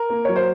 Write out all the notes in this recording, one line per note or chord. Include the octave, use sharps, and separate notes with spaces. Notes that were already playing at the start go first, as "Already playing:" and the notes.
Already playing: A#4
A#3
F#3 C#5
C5